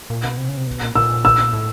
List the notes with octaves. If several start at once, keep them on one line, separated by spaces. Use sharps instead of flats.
A#2
B2
C3
C#3
C3
B2
A#2
A#2 E6
E6
A2